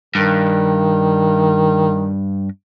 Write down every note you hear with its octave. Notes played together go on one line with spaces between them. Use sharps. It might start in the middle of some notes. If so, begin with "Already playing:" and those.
G2 D#3